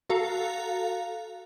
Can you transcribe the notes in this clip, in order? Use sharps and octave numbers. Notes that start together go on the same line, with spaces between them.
F#4 A4 F5 A#5